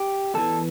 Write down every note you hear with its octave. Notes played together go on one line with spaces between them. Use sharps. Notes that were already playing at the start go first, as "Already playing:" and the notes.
Already playing: G4
E2 E3 A4